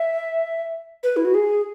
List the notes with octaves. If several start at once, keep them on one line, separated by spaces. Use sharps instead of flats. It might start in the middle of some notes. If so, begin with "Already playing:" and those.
Already playing: E5
B4
E4
F#4
G#4